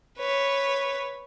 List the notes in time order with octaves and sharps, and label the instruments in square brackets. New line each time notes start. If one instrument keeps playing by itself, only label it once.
[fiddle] B4 C#5